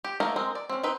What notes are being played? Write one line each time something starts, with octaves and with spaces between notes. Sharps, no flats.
G4
A3 A#3 D#4 A#4
G#3 C4 A#4
D5
C4 C#4
C4 D#4 B4